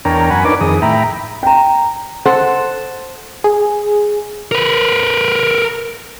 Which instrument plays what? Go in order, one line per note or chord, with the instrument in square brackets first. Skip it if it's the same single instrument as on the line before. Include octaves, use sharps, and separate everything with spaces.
[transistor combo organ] E2 D4 A#4 C#5 G5 A#5
F#2 F#5 G#5 B5
D4 D#4 A#4 B4 C#5 D6
F2 D#3 G#4 D#6
A2 E5 G5 A#5 B5
[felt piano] G5 A#5
[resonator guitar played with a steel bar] A4 C5 F#5
[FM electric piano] G#4
[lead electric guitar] A#4 B4